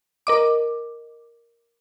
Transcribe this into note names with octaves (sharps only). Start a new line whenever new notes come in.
A#4 D#5 D6